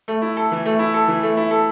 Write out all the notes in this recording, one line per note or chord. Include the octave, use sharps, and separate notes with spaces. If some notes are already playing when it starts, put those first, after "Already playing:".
A3
E4
A4
E3
A3
E4
A4
E3
A3
E4
A4